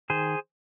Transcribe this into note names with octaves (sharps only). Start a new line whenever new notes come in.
D#3 G#4 C5